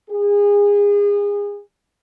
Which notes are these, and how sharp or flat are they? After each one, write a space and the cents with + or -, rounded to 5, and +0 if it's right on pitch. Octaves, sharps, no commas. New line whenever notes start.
G#4 -30